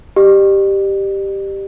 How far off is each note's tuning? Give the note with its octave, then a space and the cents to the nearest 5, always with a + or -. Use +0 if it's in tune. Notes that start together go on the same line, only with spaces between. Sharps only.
G4 +0 D5 +40